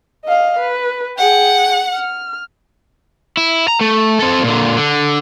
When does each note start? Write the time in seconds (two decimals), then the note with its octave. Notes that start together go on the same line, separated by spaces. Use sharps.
0.25 D#5 F5
0.59 B4
1.18 G#4 F#5 G5
1.94 F6
3.37 E4
3.68 A#5
3.81 A3
4.19 C4 A4
4.43 A#2 D3
4.77 D3